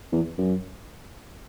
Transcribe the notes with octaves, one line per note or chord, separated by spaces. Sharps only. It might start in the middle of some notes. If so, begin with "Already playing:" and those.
E2
F#2